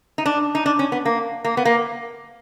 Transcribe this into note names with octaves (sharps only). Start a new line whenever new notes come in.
D#4
D4
D#4
D4
C#4
B3
A#3
A#3
B3
A#3